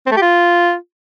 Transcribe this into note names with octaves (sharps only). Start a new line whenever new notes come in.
C4
A3
G4
F4